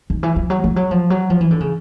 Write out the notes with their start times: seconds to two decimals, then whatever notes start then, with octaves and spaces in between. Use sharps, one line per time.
0.10 D#3
0.23 E3
0.36 F3
0.50 F#3
0.64 F3
0.76 F#3
0.91 F3
1.10 F#3
1.30 F3
1.41 E3
1.51 D3
1.60 C#3